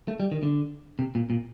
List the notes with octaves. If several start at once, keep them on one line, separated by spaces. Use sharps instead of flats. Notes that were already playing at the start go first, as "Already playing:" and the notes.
A3
G3
D#3
D3
C3
A#2
A#2